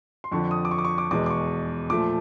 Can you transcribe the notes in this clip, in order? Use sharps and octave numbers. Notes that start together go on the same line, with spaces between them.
C6
F2 D3 F3 C#6
D#6
D6
C#6
D6
C#6
D6
E2 B2 G#3 D6
D6
C#6
A#2 F3 A3 D6